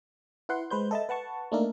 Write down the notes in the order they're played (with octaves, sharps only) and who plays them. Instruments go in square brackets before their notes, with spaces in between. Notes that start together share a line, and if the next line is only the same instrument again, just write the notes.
[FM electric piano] E4 B4 F#5 C6
G#3 B4 C5 G6
A4 D#5 E5 A5
B4 F#5 A5 C#6
A3 A#3 D4 D#4 A4 A#4